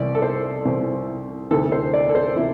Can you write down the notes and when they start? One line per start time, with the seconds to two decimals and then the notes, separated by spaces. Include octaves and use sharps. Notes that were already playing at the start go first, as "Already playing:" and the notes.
Already playing: C2 C3 E3 D5
0.15 A4
0.22 C5
0.65 C2 C3 E3
1.51 D2 C3 E3 A4
1.72 C5
1.94 D5
2.09 A4
2.15 C5
2.36 C3 E3 E4